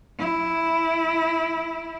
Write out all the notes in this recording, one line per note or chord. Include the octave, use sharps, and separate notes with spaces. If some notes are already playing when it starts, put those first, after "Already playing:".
E4